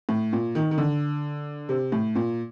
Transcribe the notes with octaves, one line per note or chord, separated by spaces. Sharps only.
A2
A#2
D#3
D#3
D3
C3
A2
A#2